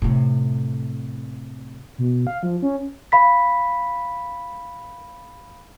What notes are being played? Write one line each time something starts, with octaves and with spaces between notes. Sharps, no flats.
A2 C3
B2
F5
F3
C#4
F5 B5 B6